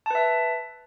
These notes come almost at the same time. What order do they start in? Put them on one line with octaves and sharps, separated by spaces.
A5 B4 E5